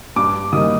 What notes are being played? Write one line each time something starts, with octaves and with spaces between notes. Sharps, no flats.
G2 D6
D#3 G3 A#3 D#4 D#6